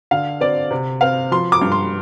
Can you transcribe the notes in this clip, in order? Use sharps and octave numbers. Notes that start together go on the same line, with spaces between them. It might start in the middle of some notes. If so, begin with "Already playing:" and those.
D3 F5
C4 D5
C3
C4 F5
F3 C6
D6
G2
C6